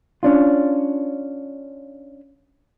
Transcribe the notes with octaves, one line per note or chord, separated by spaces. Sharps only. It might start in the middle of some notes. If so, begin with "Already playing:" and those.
C#4 D4 F4